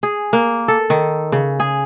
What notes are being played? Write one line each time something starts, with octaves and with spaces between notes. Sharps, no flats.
G#4
A#3
A4
D#3
C#3
G#4